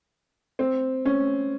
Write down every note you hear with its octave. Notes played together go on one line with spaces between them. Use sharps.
C4
C#4